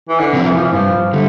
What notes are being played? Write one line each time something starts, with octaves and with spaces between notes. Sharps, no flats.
E3
D3
C3 F3 C4 E4
E3
F3
E3
G2 F3
D3 G3 A3